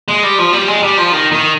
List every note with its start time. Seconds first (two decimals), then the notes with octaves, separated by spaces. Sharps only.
0.08 G#3
0.23 G3
0.38 F3
0.53 G3
0.68 G#3
0.83 G3
0.98 F3
1.12 D#3
1.32 D#3